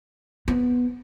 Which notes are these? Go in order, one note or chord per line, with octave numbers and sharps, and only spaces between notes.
B3